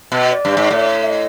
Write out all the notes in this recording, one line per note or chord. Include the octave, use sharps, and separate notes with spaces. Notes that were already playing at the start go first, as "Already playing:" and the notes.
B2
D5
G2
G#2
A2
E5
D#5